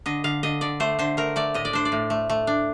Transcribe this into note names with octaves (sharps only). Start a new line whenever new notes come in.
D3 D#5
D3 F5
D3 D#5
D3 D5
A3 C5
D3 C5
A3 A#4
A3 D5
A2 D#5
D5
D4 C5
D5
A2
A3
A3
D4